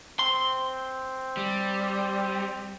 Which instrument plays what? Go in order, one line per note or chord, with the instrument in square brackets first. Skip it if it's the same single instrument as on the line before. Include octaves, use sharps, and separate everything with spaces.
[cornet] C4 [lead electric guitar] C6
[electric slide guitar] G3